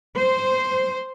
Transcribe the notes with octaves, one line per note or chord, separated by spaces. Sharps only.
C5